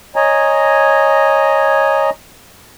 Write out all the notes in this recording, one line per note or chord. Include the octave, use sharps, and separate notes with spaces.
C#5 D#5 G#5 A#5